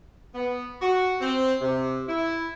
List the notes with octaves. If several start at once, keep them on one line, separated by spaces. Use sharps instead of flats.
B3
F#4
C4
C3
E4